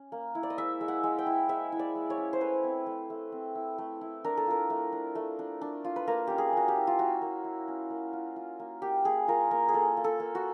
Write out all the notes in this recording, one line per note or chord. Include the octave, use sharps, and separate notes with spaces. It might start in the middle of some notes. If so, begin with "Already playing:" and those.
Already playing: C#4
A#3
E4
D5
D#5
G#3 E5
G#3
F#5
G#3
G5
E4
G#3 E5
E4
D5
G#3
C#5
C#4
C5
A3 B4
C4
A3
A3
C4
E4
A3
E4
D4 A#4
A4
F4 A#4
A3
D4
A3
D4
D4
F4
B4
A#3 A#4
C#4 G4
G#4
A#3 F#4
G4
E4
F4
A#3 F#4
A#3
E4
C#4
A#3
F4
F4
A#3
A#3 G4
A#3 G#4
F4 A#4
A#3 A#4
G#4
A#3 A4
A#3
A4
A#3
F#4